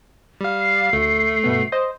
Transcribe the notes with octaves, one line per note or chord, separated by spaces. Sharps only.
G3 F5
C7
D2 A3
G2 B2 B3
C5 D#5